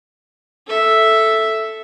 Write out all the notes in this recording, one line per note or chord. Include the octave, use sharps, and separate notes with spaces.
A4 E5